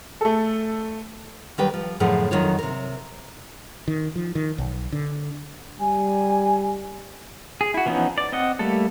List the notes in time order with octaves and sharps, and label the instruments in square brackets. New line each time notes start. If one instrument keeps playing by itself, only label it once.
[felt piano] A3 A4
[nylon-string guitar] D#3 F#3 G3 B4 G5
F3
F#2 A2 D3 F3 G#4 F#5
F2 D#3 F#3 F4 C#5
C3 A#4
[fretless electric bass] D#3
F3
D#3
B1
D3
[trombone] G3 [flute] G#5
[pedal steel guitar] G#4
E4 F#4
E3 F3 B3 C#4 D#4
D5
C4 D#5 F#5
G3 A3 A#3 A4